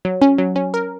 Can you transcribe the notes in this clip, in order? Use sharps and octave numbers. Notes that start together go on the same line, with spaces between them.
F#3
C#4
F#3
C#4
A#4